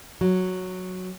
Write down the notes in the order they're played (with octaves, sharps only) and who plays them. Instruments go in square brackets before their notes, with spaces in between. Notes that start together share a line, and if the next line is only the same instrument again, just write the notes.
[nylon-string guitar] F#3